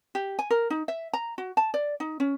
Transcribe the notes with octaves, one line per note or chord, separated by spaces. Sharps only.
G4
G#5
A#4
D#4
E5
A#5
F#4
A5
D5
D#4
C#4